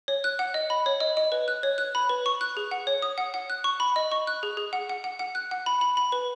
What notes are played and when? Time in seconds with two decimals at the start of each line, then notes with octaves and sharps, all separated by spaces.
0.08 C#5
0.24 F#6
0.39 F#5
0.54 D#5
0.70 B5
0.86 C#5
1.00 D#5
1.17 D#5
1.32 B4
1.48 F#6
1.63 C#5
1.78 F#6
1.95 B5
2.09 B4
2.26 C#6
2.41 F#6
2.57 G#4
2.71 F#5
2.87 C#5
3.02 D#6
3.18 F#5
3.34 F#5
3.50 F#6
3.64 C#6
3.80 B5
3.96 D#5
4.12 C#6
4.27 F#6
4.43 G#4
4.57 G#4
4.73 F#5
4.89 F#5
5.04 F#5
5.19 F#5
5.35 F#6
5.51 F#5
5.66 B5
5.81 B5
5.97 B5
6.12 B4